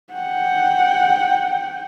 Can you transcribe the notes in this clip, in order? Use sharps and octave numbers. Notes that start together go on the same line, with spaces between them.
F#5 G5